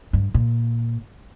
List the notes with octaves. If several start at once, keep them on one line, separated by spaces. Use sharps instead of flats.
G2
A#2